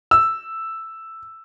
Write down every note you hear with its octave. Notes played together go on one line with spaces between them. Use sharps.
E6